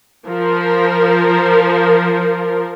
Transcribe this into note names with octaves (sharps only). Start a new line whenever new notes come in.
F3 A#4